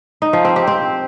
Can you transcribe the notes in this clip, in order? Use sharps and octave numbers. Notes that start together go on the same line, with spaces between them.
D#4
F3
C4
G4
C4